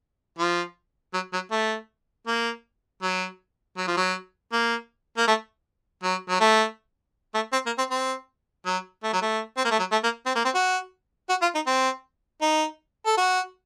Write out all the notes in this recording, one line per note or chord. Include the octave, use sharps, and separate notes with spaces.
F3
F#3
F#3
A3
A#3
F#3
F#3
F3
F#3
A#3
A#3
A3
F#3
F#3
A3
A3
C4
A#3
C4
C4
F#3
A3
F#3
A3
C4
A#3
A3
F#3
A3
A#3
C4
A#3
C4
F#4
F#4
F4
D#4
C4
D#4
A4
F#4